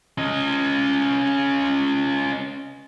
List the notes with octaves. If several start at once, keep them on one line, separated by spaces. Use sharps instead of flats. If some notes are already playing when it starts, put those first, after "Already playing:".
C#4 D#5